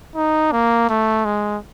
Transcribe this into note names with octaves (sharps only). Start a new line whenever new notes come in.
D#4
A#3
A3
G#3